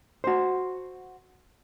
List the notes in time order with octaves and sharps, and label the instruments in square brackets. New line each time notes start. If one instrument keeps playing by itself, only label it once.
[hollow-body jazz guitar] F#4 C5